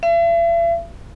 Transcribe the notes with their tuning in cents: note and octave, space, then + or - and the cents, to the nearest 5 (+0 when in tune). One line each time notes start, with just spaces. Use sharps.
E5 +45